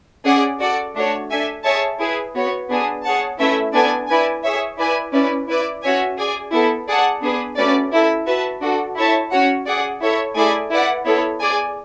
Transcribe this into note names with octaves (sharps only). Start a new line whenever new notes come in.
C#4 G#4 D5 F#5
F#4 A4 D5 F#5
A3 D4 F#4 C#5
D4 A4 E5 G#5
G#4 C#5 E5 A5
E4 G#4 B4
B3 F#4 C#5
B3 D4 G#4
G#4 C#5 F#5 A5
A3 C#4 E4 B4 E5
B3 D4 A4 D5 G#5
E4 B4 D5 G#5
G#4 C#5 E5
E4 B4 D5 G#5
C#4 E4 B4 D5
E4 B4 D5
C#4 F#4 C#5 E5 G#5
G#4 D5 G#5
B3 E4 A4
G#4 D5 F#5 A5
B3 D4 G#4 B4
A3 C#4 F#4 B4 D5
E4 A4 E5
F#4 B4 E5 A5
D4 F#4 A4
E4 A4 C#5 E5 A5
C#4 F#4 C#5 F#5
G#4 D5 F#5
E4 A4 C#5 E5
A3 E4 G#4 D5 G#5
E4 B4 D5 F#5
B3 E4 A4 C#5
G#4 D5 G#5